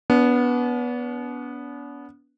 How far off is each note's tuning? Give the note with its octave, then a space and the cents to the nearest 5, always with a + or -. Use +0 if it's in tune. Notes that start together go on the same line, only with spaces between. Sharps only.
B3 -10 D4 -45